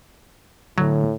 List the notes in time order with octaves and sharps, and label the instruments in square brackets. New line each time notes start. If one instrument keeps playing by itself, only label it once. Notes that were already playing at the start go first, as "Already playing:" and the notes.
[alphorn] A2 [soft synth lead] D3 [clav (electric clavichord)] F#3